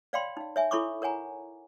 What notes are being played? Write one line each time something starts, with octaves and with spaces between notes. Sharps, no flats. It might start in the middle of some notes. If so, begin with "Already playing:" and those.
C#5 D5 F5 G5 B5 C6
D#4 F5
C#5 E5 G#5
E4 A4 C#5 B5 C#6 D6
A#4 C#5 F#5 G#5 A#5